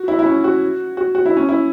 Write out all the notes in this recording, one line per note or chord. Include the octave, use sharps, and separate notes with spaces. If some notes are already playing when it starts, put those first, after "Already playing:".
Already playing: F#4
E4
E4
C#4
F#4
F#4
F#4
E4
C#4
E4